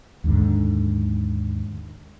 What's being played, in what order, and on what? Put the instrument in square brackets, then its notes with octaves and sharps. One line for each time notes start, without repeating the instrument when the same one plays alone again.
[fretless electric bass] D#2 G#2 D3